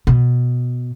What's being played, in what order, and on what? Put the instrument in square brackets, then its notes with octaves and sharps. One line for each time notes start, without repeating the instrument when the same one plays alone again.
[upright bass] B2